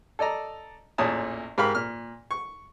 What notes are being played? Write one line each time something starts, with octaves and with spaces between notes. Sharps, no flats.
A4 D5 D#5 A#5
A1 E2 A#2 C#5 A5 D#6
G#2 G4 A#4 F5 B5
A#2 F6
C#6